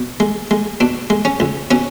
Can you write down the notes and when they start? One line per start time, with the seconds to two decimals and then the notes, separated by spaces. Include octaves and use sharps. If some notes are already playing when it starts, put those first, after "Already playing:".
Already playing: B2
0.20 G#3
0.51 G#3
0.80 B2 D4
1.10 G#3
1.25 C#4
1.40 C#2
1.71 B2 C#4